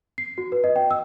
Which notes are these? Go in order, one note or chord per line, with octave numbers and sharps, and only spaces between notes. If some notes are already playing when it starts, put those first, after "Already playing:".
C7
F#4
B4
D#5
G5
E6